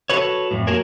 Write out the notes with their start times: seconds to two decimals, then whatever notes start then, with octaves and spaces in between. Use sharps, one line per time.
0.10 F#4 A4 B4 C#5
0.51 F2 A2
0.67 A#3 F#4 G#4 A#4 C#5